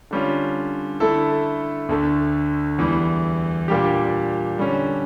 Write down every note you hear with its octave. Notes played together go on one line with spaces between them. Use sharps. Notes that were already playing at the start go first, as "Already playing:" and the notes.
D3 G3 C#4 F4
D3 A3 E4 A4
D2 D3 A3
E2 E3 G3
A#2 G3 D4 G4
D3 G3 C#4